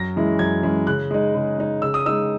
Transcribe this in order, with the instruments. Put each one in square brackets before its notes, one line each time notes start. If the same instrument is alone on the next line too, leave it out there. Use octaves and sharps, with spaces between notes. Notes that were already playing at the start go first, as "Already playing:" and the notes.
Already playing: [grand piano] F#2 A#6
E3 G#3 C#4 E4
F#2 G#6
E3 G#3 C#4 E4
C#3 F#6
G#3 D#4
C#3
G#3 D#4
C#3 E6
D#6
G#3 D#4 E6